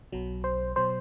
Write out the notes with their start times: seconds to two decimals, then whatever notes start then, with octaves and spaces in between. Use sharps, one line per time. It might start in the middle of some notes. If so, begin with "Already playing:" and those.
0.12 B1 B2 F#3
0.44 C5
0.76 B2 F#3 C5